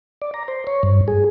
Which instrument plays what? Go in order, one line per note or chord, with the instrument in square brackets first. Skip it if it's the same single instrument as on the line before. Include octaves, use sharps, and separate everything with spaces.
[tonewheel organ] D5
A#5
C5
C#5
G2
G#4